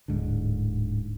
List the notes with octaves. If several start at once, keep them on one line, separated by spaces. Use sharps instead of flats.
D1 G#2 D3